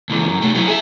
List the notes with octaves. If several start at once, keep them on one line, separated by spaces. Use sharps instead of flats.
C#2 E3
F#2
C3 A3
F#3 E4
G#4 E5